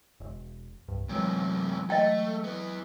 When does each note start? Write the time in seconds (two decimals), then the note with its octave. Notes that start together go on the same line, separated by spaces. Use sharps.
0.20 E1
0.88 C2 G2
1.09 F#2 C3 E3 F#3 G#3
1.90 A3 D#5 G5
2.44 B3 E4